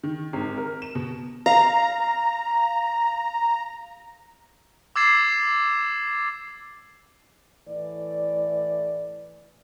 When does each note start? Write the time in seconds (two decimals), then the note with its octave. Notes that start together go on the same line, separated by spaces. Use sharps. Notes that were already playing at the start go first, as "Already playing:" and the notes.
0.04 D#3
0.33 G#1
0.58 A#4
0.82 E7
0.95 B2
1.46 F5 A#5
4.96 D6 E6 G#6 A6 C7 E7
7.67 A2 E3 A3 D5